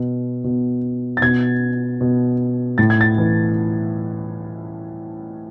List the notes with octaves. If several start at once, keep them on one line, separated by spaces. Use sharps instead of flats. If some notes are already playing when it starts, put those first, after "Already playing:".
Already playing: B2
B2
A6
B2 G#6
B2
A2 A6
G#6
A6
E3